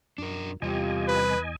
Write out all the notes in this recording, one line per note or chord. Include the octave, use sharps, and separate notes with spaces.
F#2 D4 A#4
E2 C3 G3 F4 G4 D#5 G#5
B4